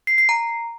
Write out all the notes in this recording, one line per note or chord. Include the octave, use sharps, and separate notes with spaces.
C7
C7
A#5